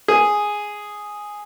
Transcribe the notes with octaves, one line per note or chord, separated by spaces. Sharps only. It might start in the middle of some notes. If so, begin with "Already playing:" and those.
G#4